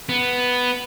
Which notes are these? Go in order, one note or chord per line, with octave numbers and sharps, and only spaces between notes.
B3